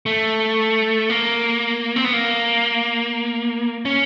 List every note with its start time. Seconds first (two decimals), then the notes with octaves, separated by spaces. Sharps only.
0.06 A3
1.10 A#3
1.96 C4
2.05 B3
2.13 A#3
3.85 C#4